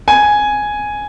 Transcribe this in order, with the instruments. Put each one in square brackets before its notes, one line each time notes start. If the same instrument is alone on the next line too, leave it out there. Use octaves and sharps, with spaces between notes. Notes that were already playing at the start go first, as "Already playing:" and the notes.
[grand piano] G#5